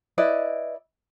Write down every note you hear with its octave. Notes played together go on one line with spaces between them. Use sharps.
E4 B4 D5 D#5